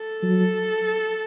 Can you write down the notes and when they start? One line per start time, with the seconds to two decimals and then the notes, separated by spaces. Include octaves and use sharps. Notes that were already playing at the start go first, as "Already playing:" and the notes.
Already playing: A4
0.23 F#3